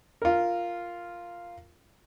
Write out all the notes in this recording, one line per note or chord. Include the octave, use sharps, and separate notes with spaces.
F4 A#4